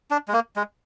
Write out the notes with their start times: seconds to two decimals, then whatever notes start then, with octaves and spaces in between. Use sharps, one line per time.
0.11 D4
0.28 G#3
0.33 A#3
0.56 G#3